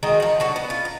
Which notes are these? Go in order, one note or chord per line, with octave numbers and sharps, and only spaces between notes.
D#3 G#3 F#4 D#5
F3 F#5
D3 F#4 F#5
B3
F4
A#5